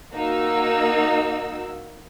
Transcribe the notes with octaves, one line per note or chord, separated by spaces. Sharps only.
A#3 D#4 F#4 E6